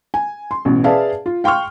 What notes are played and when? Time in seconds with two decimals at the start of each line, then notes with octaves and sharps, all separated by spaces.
0.14 G#5
0.51 C6
0.65 A1 B2
0.84 G#4 B4 D5 E5 F5 A5
1.26 F4
1.44 F5 G5 C6 C#6 F6